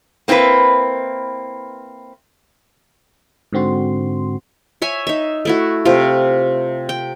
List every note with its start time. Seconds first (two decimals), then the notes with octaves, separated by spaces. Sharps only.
0.28 A#3 C4 E4 F#4 B4
3.53 G#2 D3 C4 F#4 C6
4.82 C#5 E5 G#5
5.07 D#4 E5
5.45 A3 E4 F#4
5.85 C3 A3 F4 G4
6.89 G5